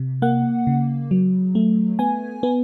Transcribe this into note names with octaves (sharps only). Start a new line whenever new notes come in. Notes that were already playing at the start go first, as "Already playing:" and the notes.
Already playing: C3
A#3 F#5
C#3
F#3
A3
B3 G#5
B3